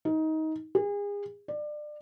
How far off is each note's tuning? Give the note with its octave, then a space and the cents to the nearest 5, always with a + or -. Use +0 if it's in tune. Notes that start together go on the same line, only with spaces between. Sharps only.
D#4 +20
G#4 -35
D5 +25